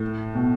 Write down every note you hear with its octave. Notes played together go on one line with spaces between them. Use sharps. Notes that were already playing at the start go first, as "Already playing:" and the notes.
Already playing: A2
B2